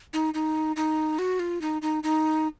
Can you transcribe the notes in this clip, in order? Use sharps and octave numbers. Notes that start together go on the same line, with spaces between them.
D#4
D#4
D#4
F#4
F4
D#4
D#4
D#4